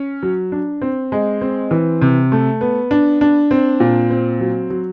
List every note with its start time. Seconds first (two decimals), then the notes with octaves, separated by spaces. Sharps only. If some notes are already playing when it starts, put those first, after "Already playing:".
Already playing: C#4
0.23 F#3
0.52 D4
0.81 C4
1.12 G#3
1.41 C4
1.71 E3
2.02 C3
2.32 A3
2.61 B3
2.91 D4
3.21 D4
3.51 C4
3.80 A#2
4.10 C4
4.40 F#3
4.70 F#3